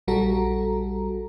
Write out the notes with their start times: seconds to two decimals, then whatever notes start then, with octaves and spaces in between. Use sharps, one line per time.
0.08 A#1 G3 F#4 A4 A#5